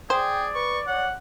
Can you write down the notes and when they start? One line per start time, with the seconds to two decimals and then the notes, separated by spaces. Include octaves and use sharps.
0.10 G#4 C5 D5 G5
0.55 B4 C#6
0.87 C#5 F#5